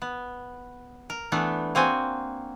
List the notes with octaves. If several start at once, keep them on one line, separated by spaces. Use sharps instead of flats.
B3
A#4
E3 A3 B3 D4
A#3 C4 F#4 G#5